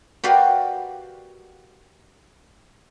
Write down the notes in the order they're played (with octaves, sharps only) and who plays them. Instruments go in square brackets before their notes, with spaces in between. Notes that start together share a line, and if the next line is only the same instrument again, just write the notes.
[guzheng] F#4 G4 A#4 B4 D5 F5